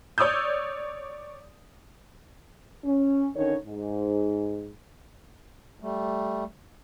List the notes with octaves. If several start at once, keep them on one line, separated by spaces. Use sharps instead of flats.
C#5 D5 D#6 E6 G6
C#4
D3 D#3 C#4 D#4 A4 C#5
G#2
G3 A3